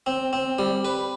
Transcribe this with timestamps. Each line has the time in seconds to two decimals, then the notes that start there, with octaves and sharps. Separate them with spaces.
0.06 C4
0.33 C4
0.59 G3
0.85 B4